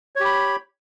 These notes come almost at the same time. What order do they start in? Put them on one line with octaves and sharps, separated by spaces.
C#5 G4 B5